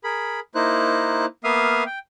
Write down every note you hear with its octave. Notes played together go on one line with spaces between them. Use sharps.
G#4 A#4 B5
A#3 D#4 E4 C5 F#6
A#3 B3 E5 F5 D#6 F6
G5